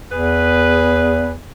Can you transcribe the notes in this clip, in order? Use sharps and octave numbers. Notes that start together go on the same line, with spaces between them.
E2 G#4 B4